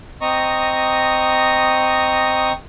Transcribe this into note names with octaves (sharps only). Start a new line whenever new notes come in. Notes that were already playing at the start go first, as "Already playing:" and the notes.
C4 D#5 A#5 C#6 D#6